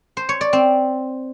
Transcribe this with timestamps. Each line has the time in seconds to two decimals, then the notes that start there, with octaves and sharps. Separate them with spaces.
0.17 C5
0.29 C#5
0.41 D5
0.53 C4